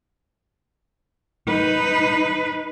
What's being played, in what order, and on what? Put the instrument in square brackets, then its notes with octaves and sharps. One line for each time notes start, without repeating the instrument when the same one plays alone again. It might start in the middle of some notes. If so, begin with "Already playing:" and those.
[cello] D#4 B4